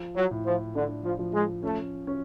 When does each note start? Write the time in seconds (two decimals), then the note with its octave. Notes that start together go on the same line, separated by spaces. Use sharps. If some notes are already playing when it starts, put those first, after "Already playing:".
Already playing: F3
0.16 F#3
0.31 A2
0.46 F3
0.75 D3 D4
1.04 F3
1.19 F3
1.34 G#3
1.63 A3 C#4
2.07 C#4